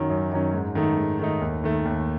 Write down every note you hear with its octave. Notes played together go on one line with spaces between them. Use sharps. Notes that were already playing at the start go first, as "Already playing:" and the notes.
Already playing: F#2 D#3 F#3 C#4
F#2
D#3 F#3 C#4
G#2
D#3 A3 D#4
G#2
D#3 A3 D#4
D#2
D#3 A3
D#2